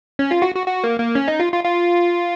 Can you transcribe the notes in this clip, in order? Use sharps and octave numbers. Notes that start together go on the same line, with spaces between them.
C#4
F4
F#4
F#4
F#4
A#3
A#3
C#4
D#4
F4
F4
F4